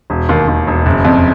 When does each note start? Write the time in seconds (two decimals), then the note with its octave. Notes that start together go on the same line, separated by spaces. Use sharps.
0.10 E1
0.29 D#2
0.48 D#2
0.67 E1
0.86 F#1
1.05 F2